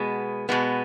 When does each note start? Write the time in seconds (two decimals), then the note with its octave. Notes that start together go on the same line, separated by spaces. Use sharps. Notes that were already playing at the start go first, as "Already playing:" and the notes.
Already playing: B2 G#3 B3
0.49 B2 G#3 B3